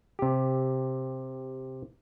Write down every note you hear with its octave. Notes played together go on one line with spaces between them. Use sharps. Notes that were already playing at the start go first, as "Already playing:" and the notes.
C3 G4